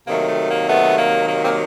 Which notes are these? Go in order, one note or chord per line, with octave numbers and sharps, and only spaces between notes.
C3 D#3 F#3 A3 A#3
A3
A#3
A3 B3
A#3
A#3
A#3 C4